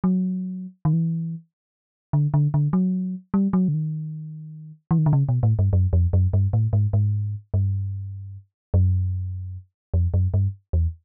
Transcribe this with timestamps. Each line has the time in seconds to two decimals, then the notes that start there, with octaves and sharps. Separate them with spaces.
0.04 F#3
0.85 D#3
0.93 E3
2.13 D3
2.34 D3
2.54 D3
2.73 F#3
3.34 G3
3.53 F#3
3.68 D3
3.74 D#3
4.91 E3
4.98 D#3
5.06 D3
5.13 C#3
5.29 B2
5.43 A2
5.59 G2
5.73 F#2
5.93 F2
6.13 F#2
6.33 G2
6.53 A2
6.73 G#2
6.93 G#2
7.54 G2
8.74 F#2
9.94 F2
10.14 F#2
10.34 G2
10.73 E2